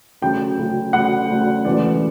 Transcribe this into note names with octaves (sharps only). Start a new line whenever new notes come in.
D2 C#3 F#3 G5
D2 C#3 F#3
D2 C#3 F#3 F#5
D2 C#3 F#3
E1 D2 C#3 E3 D5